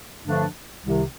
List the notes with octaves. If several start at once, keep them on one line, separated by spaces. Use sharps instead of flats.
G2 D3 F3 A3 D4
C2 C3 D#3